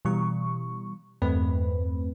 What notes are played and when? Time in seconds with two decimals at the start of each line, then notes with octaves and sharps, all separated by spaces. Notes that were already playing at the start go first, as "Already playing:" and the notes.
0.05 B2 E3 G3 C#6
1.22 E2 G2 A3 C4 B4